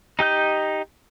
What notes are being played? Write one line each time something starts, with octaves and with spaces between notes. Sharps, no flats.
D#4 G4 D#5 G6